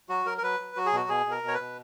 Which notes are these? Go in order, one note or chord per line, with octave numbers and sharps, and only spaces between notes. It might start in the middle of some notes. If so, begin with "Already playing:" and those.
F#3 F#4
F#3 A#4
A#4
F#3 B4
F#3
F#3 F#4
G#4
B2 F#4
B2 G#4
B2
A#4
B2
C#5
B4
B2